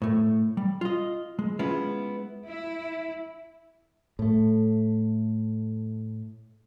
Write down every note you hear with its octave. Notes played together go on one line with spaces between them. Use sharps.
A2 A3
G3
F4 D#5
G#3
G#3 B3 C#4 E4 F4
E4
A2 A3